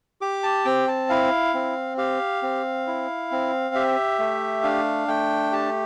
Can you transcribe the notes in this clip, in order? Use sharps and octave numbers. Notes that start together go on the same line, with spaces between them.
G4 D6
A5
C4 G5
A5
E4 F5
C4
G4 F5
C4
E4
C4
G4 E5
A3
D4 F5
A3 G5
G4 A5